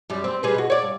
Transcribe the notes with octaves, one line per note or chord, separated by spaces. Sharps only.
F#2 G3
C4
G3 G#4 B4
B2 F#4
C#5 D5
G2